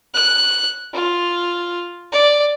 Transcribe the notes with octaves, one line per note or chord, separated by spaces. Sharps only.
F#6
F4
D5